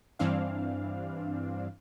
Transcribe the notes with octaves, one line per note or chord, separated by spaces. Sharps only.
G2 E3 C4 D4 F5